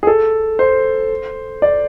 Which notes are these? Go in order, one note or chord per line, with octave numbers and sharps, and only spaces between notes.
G#4
A4
C5
D5